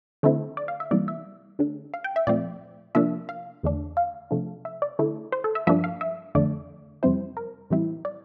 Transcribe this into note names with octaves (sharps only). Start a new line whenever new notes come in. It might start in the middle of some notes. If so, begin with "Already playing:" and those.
D3 A3 C4 E4
D5
F5
E5
C3 E3 G3 A#3 D5
E5
D3 A3 D4
F5
G5
E5
A#2 F3 A3 C4 D5
C3 F3 A#3 D4 E5
F5
E2 D3 A3 D4
F5
C3 F3 A3 D4
E5
D5
D3 A3 E4
C5
A4
E5
G2 F3 A#3 D4 E5
F5
E5
F2 D3 A3 D4 D5
F2 C3 G3 C4 E4 C5
A#4
A2 E3 G3 C4 E4
D5